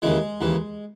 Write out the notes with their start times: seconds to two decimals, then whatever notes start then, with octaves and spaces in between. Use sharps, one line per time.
0.02 D#2 C#3 E3 G#3
0.41 D#2 C#3 E3